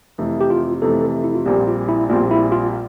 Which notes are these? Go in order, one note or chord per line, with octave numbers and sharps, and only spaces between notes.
F2 C3 E3 A3
G4
F4
F2 C3 E3 A3 A4
E4
F4
A#1 A#2 G3 C4 G4
F4
E4
A#1 A#2 G3 C4 F4
E4
F4